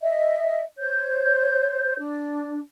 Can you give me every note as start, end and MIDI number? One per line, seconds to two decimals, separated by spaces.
0.02 0.63 75
0.02 0.63 76
0.79 1.97 72
0.79 1.97 73
0.79 1.97 91
1.98 2.60 62